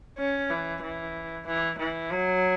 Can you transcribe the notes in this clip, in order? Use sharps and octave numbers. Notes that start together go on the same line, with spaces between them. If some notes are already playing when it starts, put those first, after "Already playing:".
C#4
E3
E3
E3
E3
F#3